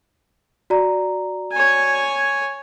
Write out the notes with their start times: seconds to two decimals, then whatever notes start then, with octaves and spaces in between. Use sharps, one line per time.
0.70 F#4 D5 A#5
1.52 C#5 G#5